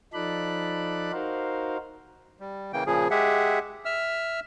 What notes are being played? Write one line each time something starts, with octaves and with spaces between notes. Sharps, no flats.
F3 D#4 A4 D5 B5 F#6
D#4 F#4 A#4 C5 F5
G3
C#3 E3 A#3 G5
A#2 C#3 F3 G#4
G#3 G4 G#4 E5 F#5
E5 E6 F6